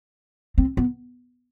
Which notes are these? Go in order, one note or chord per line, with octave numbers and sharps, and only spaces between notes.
C4
B3